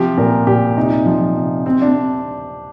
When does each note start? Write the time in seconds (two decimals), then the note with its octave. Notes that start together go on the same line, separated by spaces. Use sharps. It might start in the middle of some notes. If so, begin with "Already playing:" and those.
Already playing: C3 F3 G4
0.17 A#2 A#4
0.47 A#2 G4
0.77 C3 D#4
1.06 F3
1.36 C3
1.66 C3 C4
1.82 D4
1.88 C4